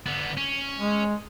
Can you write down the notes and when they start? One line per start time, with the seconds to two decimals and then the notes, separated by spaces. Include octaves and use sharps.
0.06 D3 B3
0.37 C#4
0.79 G#3